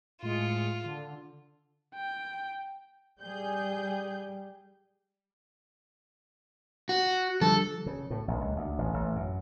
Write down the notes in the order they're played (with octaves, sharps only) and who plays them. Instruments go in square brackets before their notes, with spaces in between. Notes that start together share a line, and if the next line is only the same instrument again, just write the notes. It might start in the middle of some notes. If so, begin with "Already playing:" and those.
[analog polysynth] A2 G#3 C#7 [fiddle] F4
[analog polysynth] D3
[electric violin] G5
[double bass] G3 [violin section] G#4 G6
[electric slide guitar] F#4
[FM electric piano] D3 F3 G3 [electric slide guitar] A4
[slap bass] C#3
A2
A#1
C#2
D2
A1
A1
F#2